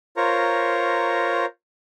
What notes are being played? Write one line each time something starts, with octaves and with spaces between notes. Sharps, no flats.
F4 A#4 C5 C#5 A#5 C#6